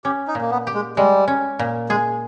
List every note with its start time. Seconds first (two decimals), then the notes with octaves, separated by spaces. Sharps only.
0.04 C#4 G4
0.28 D#4
0.35 A#2
0.41 A#3
0.51 B3
0.67 G4
0.74 G#3
0.97 G3 G#3
1.28 C#4
1.59 A#2
1.89 G#3 G#4